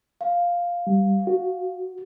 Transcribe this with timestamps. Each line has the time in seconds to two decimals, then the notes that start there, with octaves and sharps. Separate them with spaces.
0.21 F5
0.87 G3
1.27 F#4